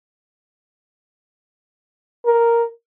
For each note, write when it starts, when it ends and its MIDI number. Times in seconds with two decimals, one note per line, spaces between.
2.26 2.66 70